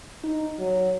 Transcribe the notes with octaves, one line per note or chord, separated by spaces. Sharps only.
D#4
F#3